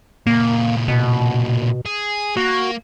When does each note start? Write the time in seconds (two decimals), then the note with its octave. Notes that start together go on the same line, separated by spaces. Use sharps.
0.27 A#2 C#3 A#3
0.88 B2
1.86 G#4
2.37 A#3 F#4